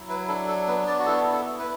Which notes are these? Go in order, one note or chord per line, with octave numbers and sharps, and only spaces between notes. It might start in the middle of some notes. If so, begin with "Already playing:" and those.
Already playing: F#3 E4
B4
D4 A4
A4
B3 B4
D5
F#4
E4 A4
A4
E4
B4